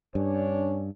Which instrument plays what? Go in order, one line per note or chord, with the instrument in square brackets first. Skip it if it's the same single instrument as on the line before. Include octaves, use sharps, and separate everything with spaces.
[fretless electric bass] G2 [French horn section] C#4 D4 C#5